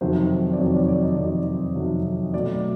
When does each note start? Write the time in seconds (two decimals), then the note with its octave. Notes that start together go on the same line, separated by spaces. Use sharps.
0.01 F2 C3 D#3 F#3 C5
0.53 D5
0.59 F2 C3 D#3 F#3 C#5
0.74 D5
0.88 D5
1.03 D#5
1.17 F2 C3 D#3 F#3 D5
1.75 F2 C3 D#3 F#3
2.33 B2 F#3 A3 D5